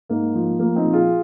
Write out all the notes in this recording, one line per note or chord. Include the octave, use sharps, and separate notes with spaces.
G#2 A#3
F3
F3 A#3
C4 D#4
A#2
F4 G#4